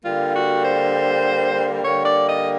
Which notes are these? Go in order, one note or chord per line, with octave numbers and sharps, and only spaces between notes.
D3 G3 A#3 F4
F#4
C5
D3 G3 A#3 C#5
D5
D#5